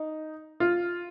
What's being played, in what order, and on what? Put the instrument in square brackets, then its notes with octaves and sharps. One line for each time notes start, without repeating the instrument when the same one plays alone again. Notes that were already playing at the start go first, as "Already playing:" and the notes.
Already playing: [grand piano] D#4
F4